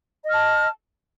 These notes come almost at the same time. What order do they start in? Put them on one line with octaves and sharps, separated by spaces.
D#5 F6 A5